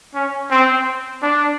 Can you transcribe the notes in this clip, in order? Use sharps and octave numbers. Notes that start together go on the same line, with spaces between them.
C#4
C4
D4